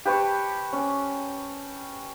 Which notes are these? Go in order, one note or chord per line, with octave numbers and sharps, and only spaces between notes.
G4 B4 A5 C#6
C#4